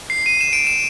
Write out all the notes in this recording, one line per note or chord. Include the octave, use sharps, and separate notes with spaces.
C7
D#7
E7
D7
E7